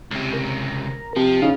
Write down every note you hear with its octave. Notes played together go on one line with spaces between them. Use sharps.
C#2 C3
A#4
C3 F3
C#3 D#4 F5